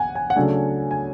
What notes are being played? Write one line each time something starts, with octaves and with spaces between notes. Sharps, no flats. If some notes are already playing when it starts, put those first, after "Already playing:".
Already playing: F#5 G#5
G#5
F#5
C#3 F#3 A3 D4 G#5
G#5